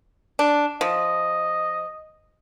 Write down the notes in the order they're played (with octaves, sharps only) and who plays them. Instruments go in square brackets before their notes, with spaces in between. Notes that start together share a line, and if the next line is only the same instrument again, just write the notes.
[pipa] D4
[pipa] F3 [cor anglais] D#5